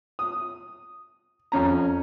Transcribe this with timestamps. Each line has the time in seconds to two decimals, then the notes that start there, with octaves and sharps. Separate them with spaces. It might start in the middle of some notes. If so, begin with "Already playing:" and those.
0.19 D#6
1.52 F2 C#4 A#5